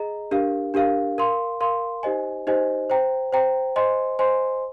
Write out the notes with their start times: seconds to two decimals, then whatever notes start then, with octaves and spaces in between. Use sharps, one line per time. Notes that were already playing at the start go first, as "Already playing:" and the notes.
Already playing: G#4 D#5 A#5
0.31 D4 G4 A#4 F5
0.74 D4 G4 A#4 F5
1.18 A#4 F5 C6
1.61 A#4 F5 C6
2.03 D#4 G4 C5 D#5 G#5
2.47 D#4 G4 C5 D#5 G#5
2.90 C5 G5 A#5
3.33 C5 G5 A#5
3.76 C5 D#5 G#5 C6
4.19 C5 D#5 G#5 C6